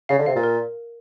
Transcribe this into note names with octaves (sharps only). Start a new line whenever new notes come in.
C#3 F5
D3
C3 F5
A#2
A#4